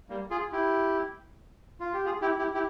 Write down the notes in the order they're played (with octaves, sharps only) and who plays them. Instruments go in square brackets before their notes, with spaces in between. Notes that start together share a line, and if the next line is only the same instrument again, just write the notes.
[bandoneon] G3 A#3
F4 G#4
E4 G4
F4
G4
F4 G#4
E4 G4
E4 G4
E4 G4